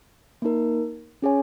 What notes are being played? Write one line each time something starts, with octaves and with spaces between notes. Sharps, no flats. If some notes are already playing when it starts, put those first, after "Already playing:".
A#3 D#4 A#4
C#4 G#4 C#5 G#5